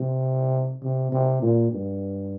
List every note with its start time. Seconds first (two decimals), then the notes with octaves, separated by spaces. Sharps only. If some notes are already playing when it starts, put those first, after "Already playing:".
Already playing: C3
0.83 C3
1.12 C3
1.42 A#2
1.71 G2